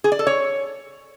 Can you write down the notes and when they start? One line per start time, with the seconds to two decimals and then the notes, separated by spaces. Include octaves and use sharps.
0.04 G#4
0.12 D5
0.19 A4
0.27 C#5